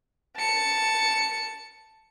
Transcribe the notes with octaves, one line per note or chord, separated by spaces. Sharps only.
A5 C#7